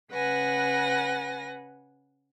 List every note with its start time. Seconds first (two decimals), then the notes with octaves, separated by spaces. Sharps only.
0.11 C#3 B4 F#5 G#5 A#6